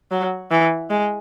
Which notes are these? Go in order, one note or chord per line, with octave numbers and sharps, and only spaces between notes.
F#3
E3
G#3